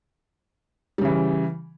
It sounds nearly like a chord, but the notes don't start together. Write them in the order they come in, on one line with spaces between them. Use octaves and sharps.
G3 C#3 E3